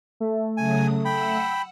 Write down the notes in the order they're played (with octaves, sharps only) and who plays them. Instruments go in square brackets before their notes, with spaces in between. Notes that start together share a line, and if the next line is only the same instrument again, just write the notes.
[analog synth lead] A3
[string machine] C#3 F#3 D#6 [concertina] G#5
[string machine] F#5 E6 [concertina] G5 B5